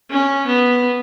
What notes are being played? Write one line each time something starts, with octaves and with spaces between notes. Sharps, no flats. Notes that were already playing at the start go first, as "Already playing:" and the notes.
C#4
B3